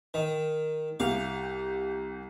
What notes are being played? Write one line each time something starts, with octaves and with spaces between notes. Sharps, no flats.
D#3
C2 G4 F5